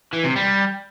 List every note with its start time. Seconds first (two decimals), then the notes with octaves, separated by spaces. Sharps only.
0.13 E3
0.24 C3
0.36 G3